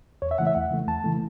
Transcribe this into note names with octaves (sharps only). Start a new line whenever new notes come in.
E2 C#5
E5
C#3 E3 A3 F#5
E5
E2 F#5
C#3 E3 A3
E2 A5
C#3 E3 A3